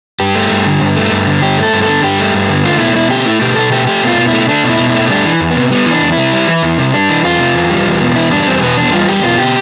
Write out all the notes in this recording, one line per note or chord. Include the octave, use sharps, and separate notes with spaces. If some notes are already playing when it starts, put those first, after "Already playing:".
G2 G4
A3
G2
D3
G2
A3
G2
D3
G2 G4
A3 A4
G2
A4
D3
G2 G4
A3
G2
D3
A3 F4
B2 E4
B2 E4
A3 G4
A3 E4
B2 G4
B2 A4
A3 G4
A3 G4
B2 F4
B2
E4
A3
A3 D4
B2
E4
B2
E4
A3
G3 D4
E3
E2
B3
C3
G3 B3
E3 D4
E2
E4
C3
G3
E3
E2
C3
G3 D4
E3
E2 F4
C3
E2
G3
E2
B2
E2 E4
G3 D4
E2 C4
B2 B3
E2 D4
G3 F4
E2 G4
B2 F4
G4